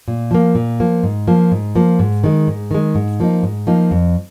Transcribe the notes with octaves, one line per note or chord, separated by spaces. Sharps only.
A#2
F3 A#3
A#2
F3 A#3
G#2
F3 A#3
G#2
F3 A#3
G#2
D#3 G#3
G#2
D#3 G#3
G#2
F3 A#3 D#4
G#2
F3 A#3 D#4
F2